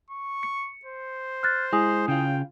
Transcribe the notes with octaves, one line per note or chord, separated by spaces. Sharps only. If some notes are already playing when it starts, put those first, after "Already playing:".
C#6
C#7
C5
F6 F#6 A6
G#3 E4 G#5 D#6
C#3 F4 G5